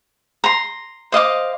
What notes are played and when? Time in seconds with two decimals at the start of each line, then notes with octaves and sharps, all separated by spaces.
0.44 A#5 C6
1.12 C5 D#5 F5 D6